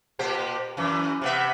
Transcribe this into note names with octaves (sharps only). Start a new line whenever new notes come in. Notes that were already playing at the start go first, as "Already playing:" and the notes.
A#2 G4 C5
F#2 E3
C3 B3 E5